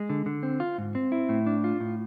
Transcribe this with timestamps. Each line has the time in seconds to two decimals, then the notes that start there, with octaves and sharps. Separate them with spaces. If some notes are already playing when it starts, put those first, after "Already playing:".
Already playing: G#3
0.10 D3
0.26 D3
0.43 C4
0.60 F4
0.78 G#2
0.95 C4
1.12 E4
1.29 A2
1.47 D4
1.64 F4
1.80 A2